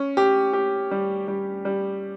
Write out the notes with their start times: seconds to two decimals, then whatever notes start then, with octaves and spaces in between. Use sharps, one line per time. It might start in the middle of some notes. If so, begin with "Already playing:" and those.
Already playing: C#4
0.17 G4
0.53 G4
0.91 G3
1.28 G3
1.65 G3